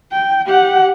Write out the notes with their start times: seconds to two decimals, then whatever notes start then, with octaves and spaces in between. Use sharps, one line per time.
0.12 G5
0.46 G4 F#5